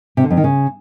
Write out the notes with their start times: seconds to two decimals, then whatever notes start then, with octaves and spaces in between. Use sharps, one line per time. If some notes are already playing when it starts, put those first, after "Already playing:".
0.17 C3
0.24 D3
0.31 F2
0.37 D#3
0.44 C#3